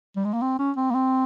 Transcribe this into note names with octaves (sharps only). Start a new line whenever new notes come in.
G3
G#3
A#3
C4
C#4
C4
A#3
C4